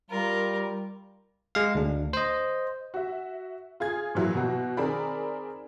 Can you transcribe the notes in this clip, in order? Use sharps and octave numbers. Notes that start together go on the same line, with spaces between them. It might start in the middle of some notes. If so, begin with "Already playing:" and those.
G3 F4 A#4
G#3 F5
D2 D4
C5 D#5
F#4 E5
F4 G#4 G#6
A#2 E3 F#3 E4
B2 F#4
D#3 C4 G#4 A#4 D5 B5